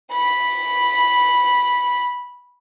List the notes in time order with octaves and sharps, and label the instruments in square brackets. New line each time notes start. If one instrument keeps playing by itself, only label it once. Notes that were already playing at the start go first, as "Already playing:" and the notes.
[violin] B5 B6